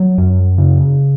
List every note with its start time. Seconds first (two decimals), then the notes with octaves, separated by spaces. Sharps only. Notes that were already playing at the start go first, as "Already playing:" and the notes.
Already playing: F#3
0.18 F#2
0.58 C#3